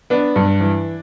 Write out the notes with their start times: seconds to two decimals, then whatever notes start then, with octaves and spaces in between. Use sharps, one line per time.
0.10 B3 D4
0.36 G2
0.60 E3